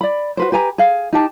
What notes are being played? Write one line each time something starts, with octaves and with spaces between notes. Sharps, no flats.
D5 B5
F#4 B4 C5
G4 B4 G#5 A#5
G#4 F5
D#4 G4 A5